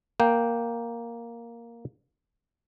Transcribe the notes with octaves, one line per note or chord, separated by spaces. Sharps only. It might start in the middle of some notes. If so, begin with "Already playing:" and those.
A#3 G5